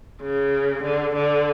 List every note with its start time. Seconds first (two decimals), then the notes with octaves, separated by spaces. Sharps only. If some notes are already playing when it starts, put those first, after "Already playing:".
0.21 C#3
0.82 D3
1.14 D3